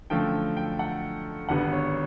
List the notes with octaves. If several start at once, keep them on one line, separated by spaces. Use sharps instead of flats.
F#2 D3 F3 A3 G5
G5
F#5
G#1 G2 D3 G3 B3 F#5
C#5